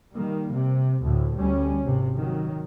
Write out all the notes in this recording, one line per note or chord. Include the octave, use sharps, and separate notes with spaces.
D#3 G3 A#3
C3
D2 A2
D2 G3 C#4
G#1 C3
D#3 F#3